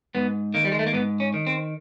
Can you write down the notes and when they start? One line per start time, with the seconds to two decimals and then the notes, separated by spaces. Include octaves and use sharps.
0.15 G#2 B3
0.54 D#3 A#3
0.65 G3
0.72 G#3
0.79 A3
0.87 A#3
0.93 G#2 B3
1.20 C#4
1.34 D#3
1.47 C4